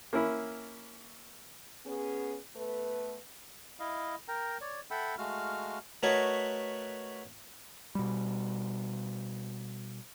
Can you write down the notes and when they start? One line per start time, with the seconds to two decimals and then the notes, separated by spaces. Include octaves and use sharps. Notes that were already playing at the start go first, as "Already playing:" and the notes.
0.13 A#3 C#4 E4
1.86 B3 C#4 G#4
2.55 A3 B3 A4 B4
3.80 E4 D#5 F5
4.28 A#4 G5 A#5
4.61 C#5 D5
4.91 A4 E5 F#5 G5 B5 E6
5.18 G#3 A3 F#4 F5 F6
6.03 A3 F#4 A#4 B4 C#5 D#5
7.95 B2 G3